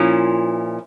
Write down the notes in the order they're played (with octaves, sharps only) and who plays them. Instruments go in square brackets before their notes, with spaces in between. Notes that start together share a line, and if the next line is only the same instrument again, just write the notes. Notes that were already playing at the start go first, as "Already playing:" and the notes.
Already playing: [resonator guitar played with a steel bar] A#2 F3 C#4 E4